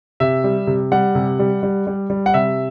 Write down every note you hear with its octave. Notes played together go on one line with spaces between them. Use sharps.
C3 E5
G3
C3
G3 F#5
C3
G3
G3
G3
G3
F#5
C3 E5